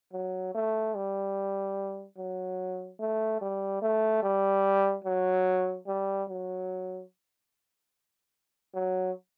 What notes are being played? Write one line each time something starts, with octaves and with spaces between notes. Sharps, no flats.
F#3
A3
G3
F#3
A3
G3
A3
G3
F#3
G3
F#3
F#3